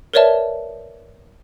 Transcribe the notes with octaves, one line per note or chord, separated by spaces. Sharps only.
A#4 B4 C#5 D5 E5 A5